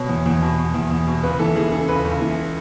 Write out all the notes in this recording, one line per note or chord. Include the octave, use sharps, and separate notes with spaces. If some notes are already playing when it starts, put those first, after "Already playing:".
Already playing: B2 C#5
E2
E2
B2
B2
E2
E2
B2
C#2 B4
E3 A4
E3 G#4
C#3 A4
C#2 B4
C#2
E3